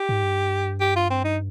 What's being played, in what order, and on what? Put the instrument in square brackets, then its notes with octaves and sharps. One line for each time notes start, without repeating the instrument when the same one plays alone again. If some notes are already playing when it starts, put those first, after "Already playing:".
Already playing: [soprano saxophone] G4
[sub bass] G#2
G2
[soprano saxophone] G4
F4
C4
D#4